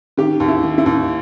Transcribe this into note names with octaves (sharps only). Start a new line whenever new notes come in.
D#3 G4
D#2
E4
D#3
E4
D#2